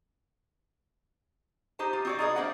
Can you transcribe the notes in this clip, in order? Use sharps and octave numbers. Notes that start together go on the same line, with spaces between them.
D#4 G4 C5 A5
F4
C4 F#4 D5
D#4 F4 G#4 B4 D#5
A#3 D4 C5 D5 E5 F#5